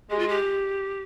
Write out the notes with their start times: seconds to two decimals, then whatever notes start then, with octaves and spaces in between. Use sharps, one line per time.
0.10 G#3 G4
0.19 F4
0.29 G4